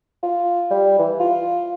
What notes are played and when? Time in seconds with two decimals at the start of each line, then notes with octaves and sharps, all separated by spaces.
0.23 F4
0.71 G3
0.99 E3
1.20 F4